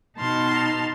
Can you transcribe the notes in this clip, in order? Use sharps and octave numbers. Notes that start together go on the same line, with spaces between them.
B2 D#4 A5 C6 F6